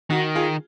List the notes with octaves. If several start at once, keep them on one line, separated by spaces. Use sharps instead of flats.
D#3 D#4 F#4
F4 G#4